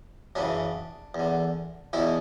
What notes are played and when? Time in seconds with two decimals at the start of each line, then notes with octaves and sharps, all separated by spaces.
0.35 F#2 C#3 E3 D4
1.15 E2 D3
1.93 E2 B2 E3 E4